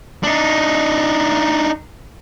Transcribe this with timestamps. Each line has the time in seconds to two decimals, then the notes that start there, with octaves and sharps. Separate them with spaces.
0.23 D4 D#4